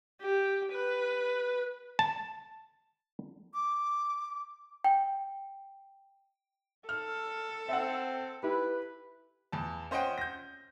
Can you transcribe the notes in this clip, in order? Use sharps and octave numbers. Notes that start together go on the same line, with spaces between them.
G4
B4
A5
D6
G5
A4 F6
C4 E5 F#5
E4 G4 B4
E2 A5
C#4 C5 D#5 F#5 G5
G6 A#6